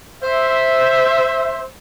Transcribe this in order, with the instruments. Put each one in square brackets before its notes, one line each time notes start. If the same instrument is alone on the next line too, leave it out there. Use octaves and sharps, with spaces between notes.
[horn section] C5 E5